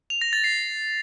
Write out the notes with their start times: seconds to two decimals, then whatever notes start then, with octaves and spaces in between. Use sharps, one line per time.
0.10 F7
0.21 A#6
0.33 A6
0.44 C7